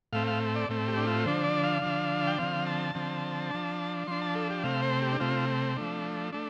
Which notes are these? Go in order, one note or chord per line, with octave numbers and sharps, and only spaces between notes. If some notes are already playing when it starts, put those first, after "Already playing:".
A2 A3 C4 F5
F5
D5
A2 A3 C4
G4
D4
F4
D3 F3 D4 C5
D5
F5
D3 F3 D4
G5
D3 F3 C4 F5
A5
D3 F3 C4
F3 D4
F3 D4 C6
A5
A4
G4
C3 A3 C4 F5
C5
G4
D4
C3 A3 C4 F4
F3 A3 D4
A3 D4